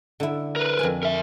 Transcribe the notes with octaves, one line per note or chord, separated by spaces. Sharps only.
D3 E4
A#4 B4
F2 G#5
A#4 E5